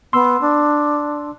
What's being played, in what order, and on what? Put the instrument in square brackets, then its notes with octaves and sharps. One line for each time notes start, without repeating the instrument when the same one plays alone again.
[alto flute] B3 [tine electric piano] C6 E6
[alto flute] D4